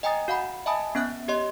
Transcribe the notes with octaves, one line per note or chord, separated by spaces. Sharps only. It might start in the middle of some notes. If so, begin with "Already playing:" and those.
D#5 G5 G#5 A#5 D#6 A6
F#4 F5 F#5 B5
D#5 E5 G#5 A5 B5 D#6
B3 C#4 E5 F#6
G4 C#5 D#5 C6